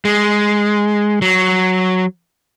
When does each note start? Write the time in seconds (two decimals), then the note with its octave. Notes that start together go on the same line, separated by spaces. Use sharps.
0.05 G#3
1.22 F#3